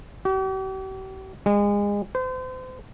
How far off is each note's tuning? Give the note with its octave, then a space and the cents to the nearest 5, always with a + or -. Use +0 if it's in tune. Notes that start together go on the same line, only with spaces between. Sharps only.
G4 -45
G#3 -30
C5 -35